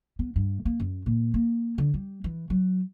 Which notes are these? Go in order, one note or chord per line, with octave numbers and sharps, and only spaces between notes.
B3
G2
A#3
F#2
A#2
A#3
D3
G3
E3
F#3